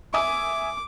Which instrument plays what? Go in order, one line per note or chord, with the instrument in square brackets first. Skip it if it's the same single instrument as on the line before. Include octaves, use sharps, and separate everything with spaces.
[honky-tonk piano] E5 G#5 D#6 [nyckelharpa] D6